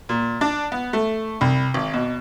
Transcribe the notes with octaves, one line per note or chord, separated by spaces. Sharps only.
A#2
D4
B3
A3
C2
G#1
B2